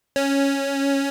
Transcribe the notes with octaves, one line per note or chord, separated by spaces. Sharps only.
C#4